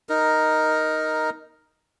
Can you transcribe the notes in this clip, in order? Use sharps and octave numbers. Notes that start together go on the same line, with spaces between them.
D#4 A#4